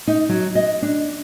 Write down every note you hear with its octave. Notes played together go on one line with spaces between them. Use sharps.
D#4
F#3
D#5
D4